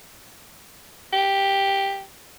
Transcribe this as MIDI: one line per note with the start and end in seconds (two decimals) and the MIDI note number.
1.13 2.02 67